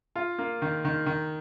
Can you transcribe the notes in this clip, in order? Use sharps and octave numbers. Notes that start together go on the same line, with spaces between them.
F4
A#3
D#3
D#3
D#3